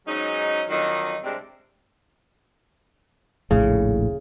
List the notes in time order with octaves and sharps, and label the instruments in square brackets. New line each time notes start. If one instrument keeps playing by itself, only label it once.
[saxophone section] G#2 F#3 C#4 D#4
F2 D3 D#3 F#3 D#4
C3 G3 G#3 C4 D4
[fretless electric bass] D#1 A#1 A2 [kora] C#3